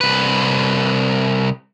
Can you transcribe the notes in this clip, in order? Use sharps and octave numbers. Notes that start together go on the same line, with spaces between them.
C2 B4